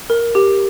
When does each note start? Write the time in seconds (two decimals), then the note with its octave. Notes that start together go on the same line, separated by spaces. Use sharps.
0.10 A#4
0.35 G4